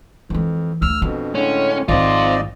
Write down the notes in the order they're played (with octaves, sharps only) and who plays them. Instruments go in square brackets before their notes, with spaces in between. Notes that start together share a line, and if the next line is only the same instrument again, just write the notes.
[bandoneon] F2 [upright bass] E3 G#3
[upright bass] D2 [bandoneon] E6 F6
[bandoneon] F2 B2 [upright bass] D4
[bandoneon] A2 D3 G#3 [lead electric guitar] C#4
[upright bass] G#1 D#3 [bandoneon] G#2 D5 D#5 [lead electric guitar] C4 F4